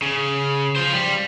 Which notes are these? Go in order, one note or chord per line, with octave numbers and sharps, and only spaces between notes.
C#3
F4 C5
G3